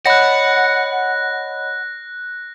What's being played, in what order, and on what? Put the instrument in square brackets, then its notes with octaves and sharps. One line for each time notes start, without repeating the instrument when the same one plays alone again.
[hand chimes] C#5 D#5 B5 [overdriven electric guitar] F#5 [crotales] F#6 A#6